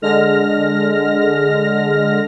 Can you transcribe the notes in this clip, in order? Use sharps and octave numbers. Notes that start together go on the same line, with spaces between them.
D3 G#3 F6 A#6